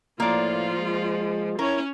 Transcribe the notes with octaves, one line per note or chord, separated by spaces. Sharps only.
A2 F3 A#3 F4 D5
G#3
C#4 E4 A#4 C#5